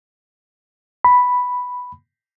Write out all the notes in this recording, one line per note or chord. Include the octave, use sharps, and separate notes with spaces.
B5